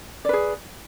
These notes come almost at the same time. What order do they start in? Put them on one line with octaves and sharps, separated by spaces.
D5 B4 G#4